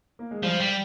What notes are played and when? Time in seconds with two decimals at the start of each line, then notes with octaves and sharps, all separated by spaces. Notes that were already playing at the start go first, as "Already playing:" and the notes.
0.19 A#3
0.31 G#3
0.43 F3 G3
0.60 G3